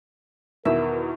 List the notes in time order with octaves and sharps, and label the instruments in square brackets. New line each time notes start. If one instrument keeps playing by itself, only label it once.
[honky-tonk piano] E2 B2 D#3 [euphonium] A#4 [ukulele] E5